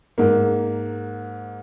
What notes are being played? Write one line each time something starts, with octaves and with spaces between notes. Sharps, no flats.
G#2 A#3